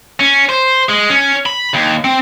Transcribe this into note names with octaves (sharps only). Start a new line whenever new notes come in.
C#4
C5
G#3
C#4
B5
D#2
C4